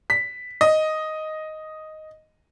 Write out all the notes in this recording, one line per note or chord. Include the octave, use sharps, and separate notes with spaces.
B6
D#5